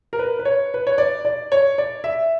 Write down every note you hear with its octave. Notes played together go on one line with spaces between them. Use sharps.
A#4
B4
B4
C#5
B4
C#5
D5
D5
C#5
D5
E5